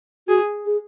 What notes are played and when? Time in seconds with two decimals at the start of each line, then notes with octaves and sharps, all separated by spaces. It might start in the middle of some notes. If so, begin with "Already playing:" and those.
0.28 F#4 G#4
0.66 G#4